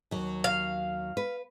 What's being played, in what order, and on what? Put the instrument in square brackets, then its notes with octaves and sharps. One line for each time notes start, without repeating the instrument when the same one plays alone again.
[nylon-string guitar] D#2 F#3
[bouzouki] F5
[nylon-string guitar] B4